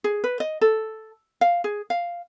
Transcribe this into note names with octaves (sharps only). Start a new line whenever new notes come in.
G#4
B4
D#5
A4
F5
G#4
F5